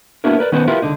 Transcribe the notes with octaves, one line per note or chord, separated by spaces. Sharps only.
A#3 B3 D4 E4 F#4 A#4
A#4 B4 D5
D#3 B3 C#4 D#4 B4 C5
E4 F4 G4 A#4 B4
C#2 D3 D4 D#4